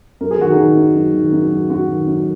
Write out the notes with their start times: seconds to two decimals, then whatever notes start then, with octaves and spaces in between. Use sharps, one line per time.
0.21 F#2 A#4
0.31 G#4
0.39 D#3 F#4
0.52 D#4 G#4
0.57 D#3
0.77 F#2
0.95 F#2
1.14 D#3
1.32 F#2
1.51 F#2
1.70 F#2 F#4
1.89 D#3
2.07 F#2